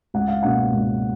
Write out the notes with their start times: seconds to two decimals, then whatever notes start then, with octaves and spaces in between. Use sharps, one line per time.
0.14 C#2 F#5
0.28 F5
0.43 B2 A#3 C#4 F#5
0.73 C#2